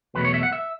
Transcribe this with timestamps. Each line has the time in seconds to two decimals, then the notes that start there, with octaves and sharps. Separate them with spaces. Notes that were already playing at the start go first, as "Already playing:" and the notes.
0.15 E2 B2 F#3 A3 B4
0.25 C#5
0.34 E5
0.43 F#5
0.53 E5